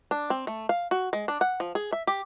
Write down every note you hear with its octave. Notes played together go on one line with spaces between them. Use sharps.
D4
C4
A3
F5
F#4
G#3
D4
F#5
F3
G#4
E5
G4